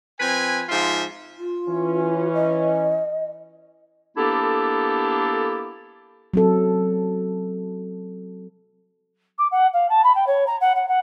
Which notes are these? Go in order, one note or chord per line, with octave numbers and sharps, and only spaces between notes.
F3 C4 B4 G#5
G#2 F3 F4 C5 E5
F4
E3 C#4
D#5
A#3 B3 D4 E4 G4 A4
F#3 C4 A4
D6
F#5
F5
A5
B5
G5
C#5
A#5
F#5
F#5
F#5